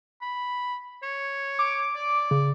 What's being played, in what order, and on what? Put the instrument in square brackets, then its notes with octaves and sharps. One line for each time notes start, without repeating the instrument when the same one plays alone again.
[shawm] B5
C#5
[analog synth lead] D6
[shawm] D5
[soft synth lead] C#3